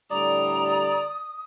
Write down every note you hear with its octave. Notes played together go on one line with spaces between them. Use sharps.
A2 D3 G3 D5 A#5 D#6